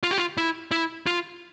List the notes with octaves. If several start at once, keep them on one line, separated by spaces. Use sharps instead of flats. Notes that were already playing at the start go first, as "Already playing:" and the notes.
F4
G4
F4
E4
E4
F4